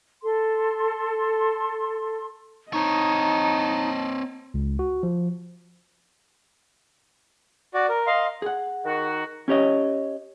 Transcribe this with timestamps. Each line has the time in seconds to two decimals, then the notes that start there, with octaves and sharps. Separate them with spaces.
0.23 A4 C6
2.73 C4 D#4 C#5 D#5 A5
4.54 C#2
4.79 F#4
5.03 F3
7.74 F#4 D5
7.89 A#4
8.07 D#5 F5 C6
8.42 G#4 F#5
8.84 D#3 F#4
9.48 C#4 G4 C#5 D#5